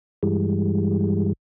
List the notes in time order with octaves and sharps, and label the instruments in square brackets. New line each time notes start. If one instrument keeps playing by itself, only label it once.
[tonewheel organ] G2 E3 G3 G#3